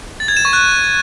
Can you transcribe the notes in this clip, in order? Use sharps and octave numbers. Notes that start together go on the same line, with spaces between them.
A6
G#6
E7
C#6
F#6